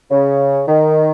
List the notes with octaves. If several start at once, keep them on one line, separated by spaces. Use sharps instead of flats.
C#3
D#3